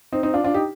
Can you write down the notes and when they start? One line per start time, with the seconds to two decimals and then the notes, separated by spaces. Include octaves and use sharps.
0.12 C4 D#4
0.23 C4 D#4
0.34 D4 F4
0.44 D4 F4
0.54 D#4 G4